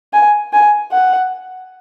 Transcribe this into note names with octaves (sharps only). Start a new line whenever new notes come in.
G#5
G#5
F#5